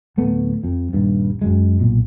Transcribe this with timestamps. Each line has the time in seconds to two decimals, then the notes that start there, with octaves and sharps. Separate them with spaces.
0.17 D1 A3 B3
0.64 F2
0.93 D#1 G2
1.42 F#2 F#3 G#3
1.80 B1 A#2